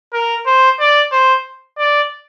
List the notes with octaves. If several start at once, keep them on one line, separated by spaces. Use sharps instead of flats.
A#4
C5
D5
C5
D5